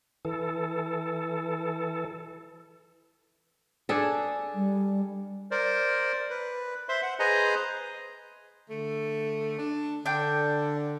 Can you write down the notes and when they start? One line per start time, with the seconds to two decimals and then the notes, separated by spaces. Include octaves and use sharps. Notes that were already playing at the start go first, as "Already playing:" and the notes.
0.25 E3 A4
3.89 D4 G#4 A4
4.55 G3
5.51 A#4 C5 D5
6.30 B4
6.89 C5 E5 C6
7.02 F#5
7.19 G#4 B4 C5 D#5 G#5 A#5
8.69 D3 A3
9.58 D4
10.06 D3 D4 G5